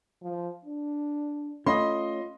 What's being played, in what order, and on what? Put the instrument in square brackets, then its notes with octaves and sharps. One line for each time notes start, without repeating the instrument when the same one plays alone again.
[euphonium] F3
D4
[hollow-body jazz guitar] A3 C#4 C#5 [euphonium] F4 [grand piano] D#5 B5 C6